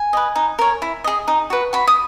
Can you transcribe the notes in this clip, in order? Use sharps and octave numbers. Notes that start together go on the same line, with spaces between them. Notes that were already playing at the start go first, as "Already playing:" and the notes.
Already playing: G#5
B4 D#5
D#4
A#4 C#5
E4
G#4 D#5
D#4
F#4 B4
F#4 B5
D#6